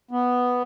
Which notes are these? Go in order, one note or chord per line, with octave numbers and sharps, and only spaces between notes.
B3